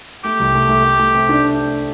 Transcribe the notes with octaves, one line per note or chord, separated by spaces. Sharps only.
A3 G4
C2
A3
A3
A3
A3
C3
D4